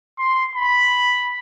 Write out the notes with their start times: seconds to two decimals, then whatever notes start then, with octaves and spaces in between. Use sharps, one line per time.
0.18 C6
0.55 B5